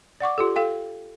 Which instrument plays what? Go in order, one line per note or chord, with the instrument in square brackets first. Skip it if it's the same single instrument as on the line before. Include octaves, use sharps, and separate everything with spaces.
[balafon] D5 F#5 C#6 D6
F4 G4 A4
A4 F5 G5